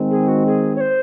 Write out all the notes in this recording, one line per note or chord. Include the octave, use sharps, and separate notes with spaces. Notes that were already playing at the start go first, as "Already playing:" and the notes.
Already playing: D#3 G#3 C4
G#4
F#4
G#4
C#5
C5